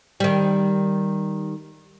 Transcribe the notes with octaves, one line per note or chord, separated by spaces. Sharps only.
D#3 G3